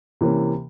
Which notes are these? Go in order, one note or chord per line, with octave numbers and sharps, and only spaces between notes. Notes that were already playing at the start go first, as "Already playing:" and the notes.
C3 E3 A#3 C#4